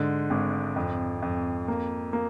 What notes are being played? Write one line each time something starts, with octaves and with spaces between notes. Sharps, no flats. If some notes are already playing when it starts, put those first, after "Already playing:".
Already playing: G#2 D3
G#1
F2
F2
A#3
A#3